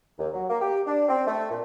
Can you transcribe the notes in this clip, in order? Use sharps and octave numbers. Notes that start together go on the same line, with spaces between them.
D#2
F#3
A#3
G4
D4
C4
A3
A#2